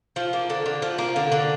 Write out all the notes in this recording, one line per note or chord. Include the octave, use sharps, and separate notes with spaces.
F3
A#3
D3
D3
F3
A#3
D3
D3